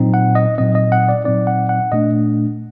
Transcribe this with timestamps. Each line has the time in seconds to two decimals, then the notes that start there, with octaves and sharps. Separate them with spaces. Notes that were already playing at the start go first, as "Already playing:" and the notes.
Already playing: A#2 F#3 C4 D#4
0.14 F#5
0.35 D#5
0.58 A#2 F#3 C4 D#4 D#5
0.75 D#5
0.92 F#5
1.09 D5
1.24 A#2 F#3 C4 D#4 D5
1.47 F#5
1.69 F#5
1.92 A#2 A3 D4 D#5